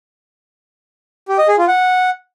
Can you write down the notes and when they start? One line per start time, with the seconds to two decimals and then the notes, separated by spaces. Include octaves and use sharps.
1.28 G4
1.38 D#5
1.48 G#4
1.58 F4
1.68 F#5